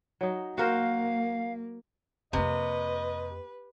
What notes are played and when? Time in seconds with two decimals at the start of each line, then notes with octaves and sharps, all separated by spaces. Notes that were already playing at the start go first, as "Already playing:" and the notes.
0.21 F#3 D#4
0.58 A#3 F#4 A#4 C5 F5
2.33 F2 C3 A#3 B4 D#5